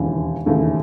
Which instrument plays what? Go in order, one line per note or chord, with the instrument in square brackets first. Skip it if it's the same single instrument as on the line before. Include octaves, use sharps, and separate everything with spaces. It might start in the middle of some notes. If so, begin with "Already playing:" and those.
Already playing: [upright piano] E1 D#2 C#3 E3
E1 D#2 C#3 E3 A3